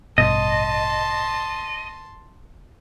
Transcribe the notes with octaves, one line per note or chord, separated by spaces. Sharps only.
A1 G2 B2 D#5 A5 C6